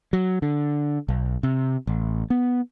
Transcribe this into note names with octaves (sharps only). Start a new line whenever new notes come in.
F#3
D3
B1
C3
A1
B3